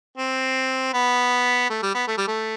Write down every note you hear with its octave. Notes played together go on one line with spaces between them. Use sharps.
C4
B3
A3
G3
B3
A3
G3
A3